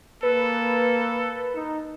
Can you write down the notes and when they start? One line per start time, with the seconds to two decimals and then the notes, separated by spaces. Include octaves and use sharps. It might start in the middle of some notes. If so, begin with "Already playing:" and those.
0.23 A#3 A4 B4
1.55 D#4